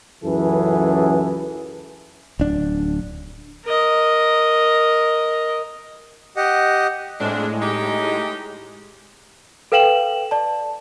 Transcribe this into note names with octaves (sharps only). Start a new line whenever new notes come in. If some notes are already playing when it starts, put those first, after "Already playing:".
C#2 F#2 E3 G#4 A4 B4
D1 D4
A#4 D#5
G4 D#5 F#5
F2 A2 G#3 D4
D#4 G4
A4 B4 F5 G5 E7 F#7
D5 A5